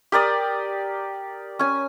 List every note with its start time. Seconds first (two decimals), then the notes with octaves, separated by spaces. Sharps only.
0.12 G4 A#4 D5 D#6
1.59 C#4 G#5